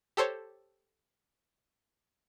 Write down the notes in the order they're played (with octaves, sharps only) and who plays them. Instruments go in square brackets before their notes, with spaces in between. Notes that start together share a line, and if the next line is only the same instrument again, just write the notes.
[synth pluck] G4 A4 C5 C#5